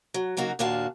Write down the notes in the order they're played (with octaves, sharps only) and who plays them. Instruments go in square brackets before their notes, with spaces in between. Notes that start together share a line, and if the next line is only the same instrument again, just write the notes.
[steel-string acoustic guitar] F#3
C#3 F#3 A#3 D#4 F#4
D#2 A#2 D4 F#4 F5 A5